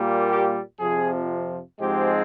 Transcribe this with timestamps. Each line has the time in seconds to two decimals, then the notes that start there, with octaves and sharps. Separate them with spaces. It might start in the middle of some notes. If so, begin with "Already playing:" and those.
Already playing: A#2 G3 A#3
0.28 G4
0.78 F2 C3 F3 G#4
1.79 G#2 F3 G#3 C4 G4